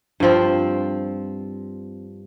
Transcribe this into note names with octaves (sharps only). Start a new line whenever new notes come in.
G2 F3 C4